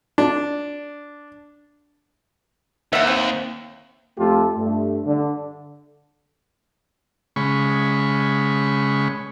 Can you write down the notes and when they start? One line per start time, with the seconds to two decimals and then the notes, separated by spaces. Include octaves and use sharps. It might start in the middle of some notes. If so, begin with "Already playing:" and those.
0.18 D4
2.93 D#2 E5 F#5
3.07 C4
4.18 F2 A3 F4 G4 A4
4.56 G2 A3
5.06 D3
7.36 C#3 G#3 B5 C#6